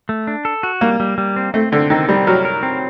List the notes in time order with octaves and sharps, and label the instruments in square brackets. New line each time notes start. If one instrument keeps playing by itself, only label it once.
[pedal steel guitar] A3
D4
A4
F#4
[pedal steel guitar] G3 [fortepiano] A#3
[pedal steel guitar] G3
G3
C4
[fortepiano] A3 [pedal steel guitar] C4
[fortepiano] D3 [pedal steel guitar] C4
[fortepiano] D#3 [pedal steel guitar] C4
[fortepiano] G3 [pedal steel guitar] C4
[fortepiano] F#3 [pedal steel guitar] A#4
[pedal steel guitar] A#4
C4